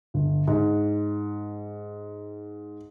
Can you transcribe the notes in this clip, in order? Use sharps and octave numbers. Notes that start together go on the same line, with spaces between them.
G1
G#2